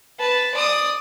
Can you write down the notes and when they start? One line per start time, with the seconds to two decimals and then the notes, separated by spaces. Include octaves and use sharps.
0.19 B4 A5
0.55 D5 D#6